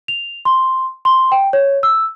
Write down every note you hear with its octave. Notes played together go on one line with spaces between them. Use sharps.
F7
C6
C6
G5
C#5
E6